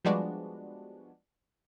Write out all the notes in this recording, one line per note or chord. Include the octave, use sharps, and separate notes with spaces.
F3 G3 G#3 B3 D4 F#4